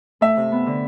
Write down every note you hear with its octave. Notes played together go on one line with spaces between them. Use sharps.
A3 E5
C3
B3
D3